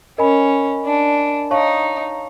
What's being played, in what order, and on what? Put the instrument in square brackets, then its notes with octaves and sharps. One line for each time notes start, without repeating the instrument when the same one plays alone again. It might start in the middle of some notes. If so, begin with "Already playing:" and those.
[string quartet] C#4 [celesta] A#4 D#5 G#5 B5
[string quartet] D4
[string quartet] D#4 [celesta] C#5 F5 A5 C#6